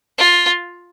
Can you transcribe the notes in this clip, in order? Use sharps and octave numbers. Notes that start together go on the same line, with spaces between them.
F4